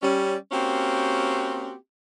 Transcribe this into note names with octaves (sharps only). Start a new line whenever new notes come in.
G3 C#4
A#3 C4 C#4 F#4 G4